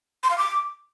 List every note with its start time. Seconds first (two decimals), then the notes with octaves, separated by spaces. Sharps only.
0.23 C6
0.31 F5
0.38 D6